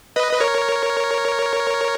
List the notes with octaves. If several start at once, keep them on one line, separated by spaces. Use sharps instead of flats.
B4 D#5
B4
A#4 C#5